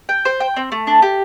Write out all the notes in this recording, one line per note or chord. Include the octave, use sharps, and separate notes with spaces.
G5
C5
G5
C4
A3
D4
G4